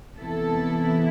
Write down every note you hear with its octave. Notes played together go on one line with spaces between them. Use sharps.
C3 E3 B3 E4 A4